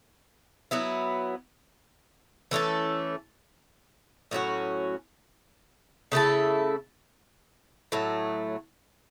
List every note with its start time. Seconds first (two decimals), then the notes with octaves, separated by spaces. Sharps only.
0.71 F#3 B3 E4
2.51 E3 A3 C#4 A4
4.31 A2 F#3 C#4 F#4
6.12 C#3 A3 E4 A4
7.92 A2 F#3 A3